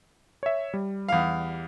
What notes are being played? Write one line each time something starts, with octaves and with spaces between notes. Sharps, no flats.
C#5 E5
G3
E2 F5